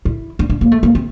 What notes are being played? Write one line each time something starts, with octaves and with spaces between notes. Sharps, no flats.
E4
D4
D4
A#3
A3
A#3
C4